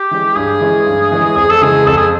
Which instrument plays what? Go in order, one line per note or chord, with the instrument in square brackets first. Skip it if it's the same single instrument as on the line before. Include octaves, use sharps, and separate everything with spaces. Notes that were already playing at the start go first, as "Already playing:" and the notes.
Already playing: [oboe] G4
[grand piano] E3 G#3 C#4
[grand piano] G2 [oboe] G#4
[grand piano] E3 G#3 C#4
G2
E3 G#3 C#4
[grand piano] F2 [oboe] G#4
[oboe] A4
[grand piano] C#3 E3 G#3 [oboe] G#4
[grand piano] F2 [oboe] A4
[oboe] G#4